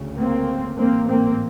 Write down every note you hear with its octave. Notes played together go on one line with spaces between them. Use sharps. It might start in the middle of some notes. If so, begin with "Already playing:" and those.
Already playing: D2 C#3
A#3 C4
A1 G#2 A#3 C4
A#3 C4